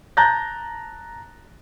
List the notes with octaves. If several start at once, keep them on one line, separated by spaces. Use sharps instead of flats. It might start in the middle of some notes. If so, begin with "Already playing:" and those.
A5 A#5 F#6 G6 A6 A#6